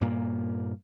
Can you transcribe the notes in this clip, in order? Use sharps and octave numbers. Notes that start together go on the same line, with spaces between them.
G2 A#2 A#3